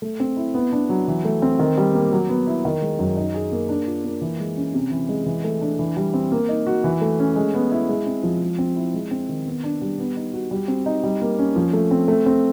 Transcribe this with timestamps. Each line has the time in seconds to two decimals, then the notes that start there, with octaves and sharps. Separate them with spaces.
0.02 A3
0.20 C4
0.37 E4
0.54 B3
0.72 D4
0.89 F#3
1.08 E3
1.25 A3
1.42 C4
1.59 D#3
1.77 G3
1.95 A#3
2.12 F#3
2.29 B3
2.47 E4
2.65 D#3
2.82 G#3
2.99 F#2
3.17 D#4
3.34 G#4
3.52 A#3
3.69 D4
3.87 F4
4.05 A#3
4.21 E3
4.39 G#3
4.57 C#4
4.74 C3
4.91 E3
5.09 G#3
5.26 E3
5.44 A3
5.61 D4
5.79 E3
5.97 G3
6.14 C4
6.32 A#3
6.49 D#4
6.67 F#4
6.84 E3
7.01 A3
7.19 C#4
7.36 G#3
7.54 B3
7.72 E4
7.89 G#3
8.07 C4
8.23 F3
8.41 G#3
8.59 C4
8.76 E4
8.94 G#3
9.11 C4
9.29 D#3
9.46 B3
9.64 D4
9.81 G3
9.99 B3
10.16 D#4
10.33 F#4
10.51 G3
10.68 C4
10.86 D#4
11.03 G3
11.21 A#3
11.39 C#4
11.56 F3
11.73 A3
11.91 C4
12.08 A3
12.26 C4